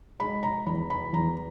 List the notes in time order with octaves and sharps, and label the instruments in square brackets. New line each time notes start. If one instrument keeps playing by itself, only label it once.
[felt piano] G#3 B5
A#5
E2 B5
B5
E2 A#5